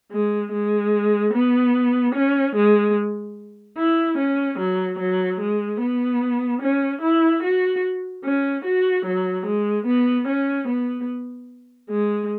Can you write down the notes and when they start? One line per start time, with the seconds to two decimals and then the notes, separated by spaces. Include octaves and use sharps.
0.12 G#3
0.52 G#3
1.34 B3
2.15 C#4
2.56 G#3
3.78 E4
4.18 C#4
4.59 F#3
4.99 F#3
5.40 G#3
5.80 B3
6.62 C#4
7.02 E4
7.43 F#4
8.25 C#4
8.65 F#4
9.06 F#3
9.46 G#3
9.87 B3
10.28 C#4
10.68 B3
11.90 G#3